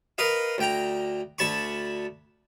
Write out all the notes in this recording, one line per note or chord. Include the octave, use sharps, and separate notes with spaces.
A#4 B4 D#5 F5
D2 G5 A#5
D2 A5 B5 C#6